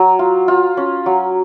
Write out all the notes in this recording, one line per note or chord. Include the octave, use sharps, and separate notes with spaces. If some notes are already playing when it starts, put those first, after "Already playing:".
Already playing: F#3
F4
F4
C#4
F#3